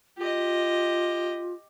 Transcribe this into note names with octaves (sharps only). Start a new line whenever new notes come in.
F4 G4 D#5